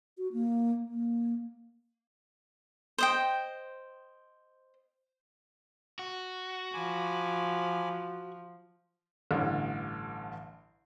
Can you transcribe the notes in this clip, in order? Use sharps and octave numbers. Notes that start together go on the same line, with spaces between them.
F#4
A#3
A#3
C5 D#5 G5
F#4
F3 G#5 B5 D6
A1 G2 D3